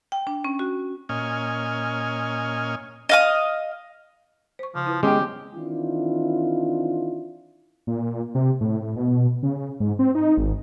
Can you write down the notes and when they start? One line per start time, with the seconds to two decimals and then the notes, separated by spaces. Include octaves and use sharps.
0.12 G5
0.27 D4
0.44 C#4
0.59 F#4
1.09 A#2 C#4 D#5 G#5 F6
3.09 D#5 F5 D#6
4.59 C5 C#6
4.75 C#3 F3
4.86 E4 B4
5.03 D#3 G#3 B3 C#4 G4 G5
5.55 D#3 E3 C4 D4 E4 F4
7.87 A#2
8.35 C3
8.61 A2
8.96 B2
9.43 C#3
9.80 G#2
9.99 C4
10.15 D#4
10.38 G#1